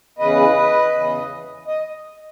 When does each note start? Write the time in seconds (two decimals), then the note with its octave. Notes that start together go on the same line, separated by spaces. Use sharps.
0.19 E2 C#3 E3 B4 D#5
0.93 E2 C#3 E3
1.67 D#5